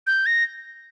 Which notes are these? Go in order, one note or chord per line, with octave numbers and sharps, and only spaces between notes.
G6
A#6